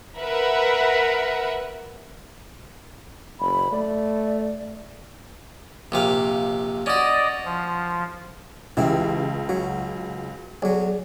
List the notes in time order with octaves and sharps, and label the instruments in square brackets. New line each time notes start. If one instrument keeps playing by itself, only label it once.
[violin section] A#4 B4 E5 F#5
[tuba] F#1 [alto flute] B5
[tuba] A3 [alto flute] D5
[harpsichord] A#1 C3 F5
[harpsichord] C#4 F#4 [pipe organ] D5 D#5
[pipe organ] F3
[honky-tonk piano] C#2 [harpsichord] E3 C4 [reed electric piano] C#4 E4 G4
[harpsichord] F#3 [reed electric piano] F#4
[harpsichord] B1 F#3 [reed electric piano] G#4 C#5 D5